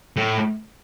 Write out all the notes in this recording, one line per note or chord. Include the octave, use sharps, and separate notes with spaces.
A2